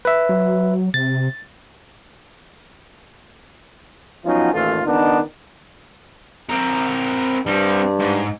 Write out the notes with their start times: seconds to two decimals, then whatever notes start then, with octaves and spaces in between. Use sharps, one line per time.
0.05 B4 E5
0.29 F#3
0.94 C3 A6
4.25 F3 F#3 B3 C#4 D#4 F4
4.54 A1 D#2 E3 A3 F4 A4
4.86 C#2 D#3 B3 D4 D#4
6.50 C4 A#4
7.47 G2 G3 C4
7.99 G#2